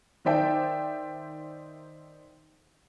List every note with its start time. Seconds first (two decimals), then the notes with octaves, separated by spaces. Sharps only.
0.25 D#3 D#4 C5 D5 E5 G5